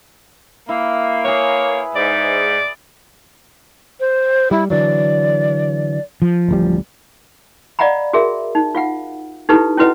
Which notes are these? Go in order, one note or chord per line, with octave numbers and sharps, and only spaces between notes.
A#3 E4
G#4 B4 C#5
G#2 D5
C5
G3 E4
D3 E3 F#3 D5
F3
D1 A1 G3
D5 D#5 F5 F#5 A#5 B5
F#4 G#4 A#4 E5
D#4
F4 F5 F#5
D#4 E4 G4 A4 B4
C#4 E4 F#4 B4 D#5 F#5